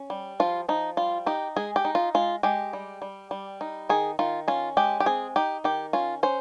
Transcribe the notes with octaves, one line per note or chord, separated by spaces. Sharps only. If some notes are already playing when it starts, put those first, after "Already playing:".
Already playing: C#4
G3
F3 F4
F3 D#4
G3 F4
D#4 G4
G#3 G#4
G4
D#4
F4
G#3 F4
G#3 G4
G3
G3
G3
D#4
D#3 G#4
D#3 F4
C#4 F4
G#3 G4
G4
C4 G#4
D#4 G4
D#3 G4
C#4 F4
C#4 C5